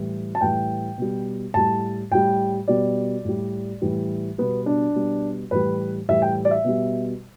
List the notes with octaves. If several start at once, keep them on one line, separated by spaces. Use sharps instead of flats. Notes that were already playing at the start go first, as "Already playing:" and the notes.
Already playing: A2 E3 G3
A5
A2 E3 G3 G5
B2 G3
A2 G3 A5
A2 G3 G5
B2 G3 D5
A2 G3
A2 E3 G3
B2 G3 B3
D4
B2 G3
A2 E3 G3 B4
A2 E3 G3 E5
G5
D5
E5
B2 G3